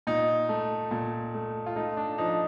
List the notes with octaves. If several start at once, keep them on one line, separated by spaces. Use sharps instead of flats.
A#2 D#4
A3
A#2
A3
F4
A3 D#4
D4
F3 D#4